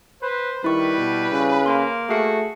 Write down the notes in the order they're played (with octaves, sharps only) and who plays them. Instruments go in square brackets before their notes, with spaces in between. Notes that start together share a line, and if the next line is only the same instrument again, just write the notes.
[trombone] B4 [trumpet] C5
[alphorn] D#3 [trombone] G3 [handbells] E4 C#6 [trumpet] B4
[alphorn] B2
C#3
[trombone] A#3 [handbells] C6
[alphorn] A3 [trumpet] F#4 [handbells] G#4 C7 C#7